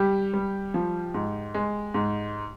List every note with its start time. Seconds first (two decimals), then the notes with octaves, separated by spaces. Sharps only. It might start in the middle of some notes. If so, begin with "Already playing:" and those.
Already playing: G3 G4
0.33 G3
0.74 F3
1.14 G#2
1.54 G#3
1.94 G#2